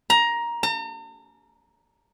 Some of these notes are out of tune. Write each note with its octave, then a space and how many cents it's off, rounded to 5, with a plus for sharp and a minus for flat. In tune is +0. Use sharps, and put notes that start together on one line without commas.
A#5 +15
A#5 -45